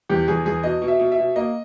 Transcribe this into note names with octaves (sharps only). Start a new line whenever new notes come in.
E2 G4
E2 G#4
E2 G#4
B2 D#5
B2
E5
B2
E5
B2
A#3 D#5